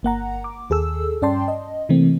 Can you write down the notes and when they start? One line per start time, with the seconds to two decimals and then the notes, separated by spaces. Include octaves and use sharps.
0.03 G1 A#3 F#5 A#5
0.44 D6
0.70 D#2 G#4 A4 E6
1.22 G2 C#4 D5 G5 A5 C6
1.48 D#5
1.89 C3 E3 A3 A#3 C4